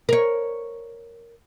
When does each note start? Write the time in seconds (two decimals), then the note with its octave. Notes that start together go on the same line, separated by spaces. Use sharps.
0.09 A#4 C#5